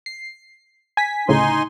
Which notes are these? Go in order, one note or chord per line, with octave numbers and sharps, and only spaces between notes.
C7
G#5 B6
D2 A2 C#3 D#4 G#5 C6